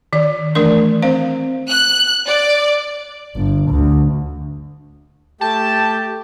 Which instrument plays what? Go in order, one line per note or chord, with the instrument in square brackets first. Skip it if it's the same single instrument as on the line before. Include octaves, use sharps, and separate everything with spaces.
[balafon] D#3 D5
E3 A3 D4 A#4 D5 C6
C4 C5 F5
[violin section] F#6
D5
[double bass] G1
D2
[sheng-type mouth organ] A3 G5 [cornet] G4 [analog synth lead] A5